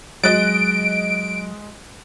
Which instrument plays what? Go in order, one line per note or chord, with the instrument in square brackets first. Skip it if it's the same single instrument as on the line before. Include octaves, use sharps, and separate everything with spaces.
[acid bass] F#3 [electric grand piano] G#3 [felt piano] D#5 F#6 A6 [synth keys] D7